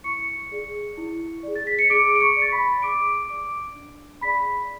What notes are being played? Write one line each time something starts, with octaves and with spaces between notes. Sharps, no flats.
E4 C#6 C#7
G#4 D5
E4
G#4 D5
A6
B6
C#7
G#4 D6 D7
D7
C#6 C#7
D5
A6
B5 B6
G#4 D6 D7
D5 D6 D7
D4
G#4 D5 B5 B6